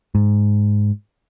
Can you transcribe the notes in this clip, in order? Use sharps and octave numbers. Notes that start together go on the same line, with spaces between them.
G#2